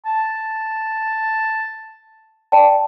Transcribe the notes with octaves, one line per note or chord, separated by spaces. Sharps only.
A5
D5 G5 A5